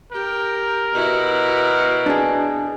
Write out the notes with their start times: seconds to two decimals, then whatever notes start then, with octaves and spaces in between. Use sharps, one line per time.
0.13 G4 A#4 G5
0.95 B2 E4 F#4
2.06 D4 G#4